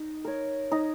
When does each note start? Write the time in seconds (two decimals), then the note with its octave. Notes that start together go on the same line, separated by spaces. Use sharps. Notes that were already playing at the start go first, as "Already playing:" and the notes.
Already playing: D#4
0.25 A#4 C#5
0.72 D#4